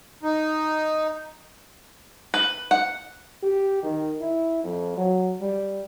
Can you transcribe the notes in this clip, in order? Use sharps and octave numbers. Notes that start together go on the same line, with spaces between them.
D#4
B4
F#5
G4
D#3
E4
F2
F#3
G3